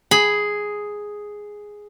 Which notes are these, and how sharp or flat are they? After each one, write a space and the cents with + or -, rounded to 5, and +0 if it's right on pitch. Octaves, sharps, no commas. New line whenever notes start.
G#4 +0 B5 +0